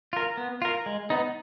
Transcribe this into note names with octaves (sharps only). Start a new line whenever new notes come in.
F4 A#4
B3
F4 A#4
G#3
B3 D#4